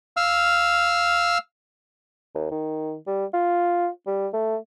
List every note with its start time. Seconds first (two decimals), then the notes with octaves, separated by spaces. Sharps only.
0.17 F5 E6 F6
2.35 D#2
2.51 D#3
3.07 G3
3.34 F4
4.07 G3
4.33 A3